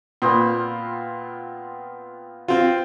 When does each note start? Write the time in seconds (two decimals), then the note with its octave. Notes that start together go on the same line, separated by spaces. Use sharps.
0.22 A#2 B3 C4 F4
2.48 C4 F4